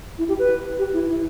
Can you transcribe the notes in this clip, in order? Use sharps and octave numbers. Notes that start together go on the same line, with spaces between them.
E4
G4
B4
G4
E4
E4